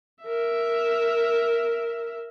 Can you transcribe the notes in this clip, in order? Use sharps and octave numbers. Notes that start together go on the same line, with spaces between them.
A#4 E5